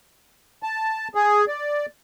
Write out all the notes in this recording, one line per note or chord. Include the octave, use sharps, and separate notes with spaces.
A5
G#4
D5